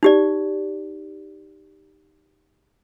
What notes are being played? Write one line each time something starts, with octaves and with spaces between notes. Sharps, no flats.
D#4 G4 D5